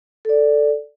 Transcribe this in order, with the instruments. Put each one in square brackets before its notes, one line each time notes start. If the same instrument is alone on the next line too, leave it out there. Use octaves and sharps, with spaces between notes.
[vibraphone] A4 D5